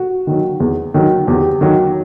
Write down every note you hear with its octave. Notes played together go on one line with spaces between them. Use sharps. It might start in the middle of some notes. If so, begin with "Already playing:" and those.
Already playing: F#4
D#3 F#3
E2
D#3 F#3
E2 G4
D#3 F#3